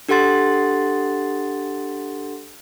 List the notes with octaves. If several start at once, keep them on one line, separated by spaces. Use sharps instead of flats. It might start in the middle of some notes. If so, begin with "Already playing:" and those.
D4 G4 A4 F#5 C6 A6